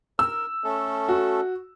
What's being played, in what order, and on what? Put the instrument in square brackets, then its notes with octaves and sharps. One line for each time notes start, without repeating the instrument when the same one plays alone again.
[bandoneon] A#4 [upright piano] E6
[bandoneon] A3 C#4 A4
[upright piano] F#4